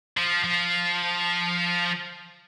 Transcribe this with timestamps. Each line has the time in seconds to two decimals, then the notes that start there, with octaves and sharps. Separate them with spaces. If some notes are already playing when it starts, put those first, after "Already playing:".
0.17 F3
0.44 F3